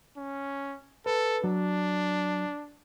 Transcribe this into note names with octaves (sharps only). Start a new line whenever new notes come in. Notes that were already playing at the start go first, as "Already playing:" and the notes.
C#4
A4 B4
F#3 D4